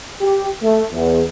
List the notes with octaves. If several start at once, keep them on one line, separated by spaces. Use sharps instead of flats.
G4
A3
E2